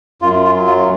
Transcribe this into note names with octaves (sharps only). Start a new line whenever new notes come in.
F#2 F4
F4
F#3
F4